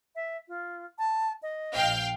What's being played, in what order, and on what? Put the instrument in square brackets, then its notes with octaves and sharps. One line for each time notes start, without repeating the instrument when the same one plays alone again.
[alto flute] E5
F4
A5
D#5
[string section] A#1 F5 G5